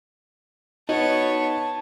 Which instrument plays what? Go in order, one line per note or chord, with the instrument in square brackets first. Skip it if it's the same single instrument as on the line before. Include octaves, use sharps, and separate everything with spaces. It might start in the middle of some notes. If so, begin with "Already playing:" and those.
[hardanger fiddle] B3 C#5 [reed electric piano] D#4 [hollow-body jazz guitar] F#4 D#5 [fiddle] A5